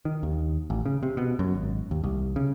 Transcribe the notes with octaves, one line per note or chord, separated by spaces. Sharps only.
D#3
D#2
A1
C#3
C3
B2
F#2
G#1
D#2
C2
C#3